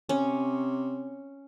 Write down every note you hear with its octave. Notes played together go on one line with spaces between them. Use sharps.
C3 C#4